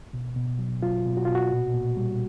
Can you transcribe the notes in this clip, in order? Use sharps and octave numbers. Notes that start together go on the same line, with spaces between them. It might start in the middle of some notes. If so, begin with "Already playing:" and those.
B2
B2
F#3
F#3 F4
B2
F#4
B2 F4
F#4
A#2
A#2
G3